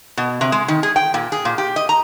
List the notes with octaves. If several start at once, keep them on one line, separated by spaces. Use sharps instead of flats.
B2
C3
G#3
D#3
G#4
G5
A#2
G#4
A#2
G4
D#5
A#5